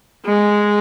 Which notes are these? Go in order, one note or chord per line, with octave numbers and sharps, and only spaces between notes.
G#3